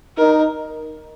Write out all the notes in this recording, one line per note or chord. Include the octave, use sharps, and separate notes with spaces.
D#4 A#4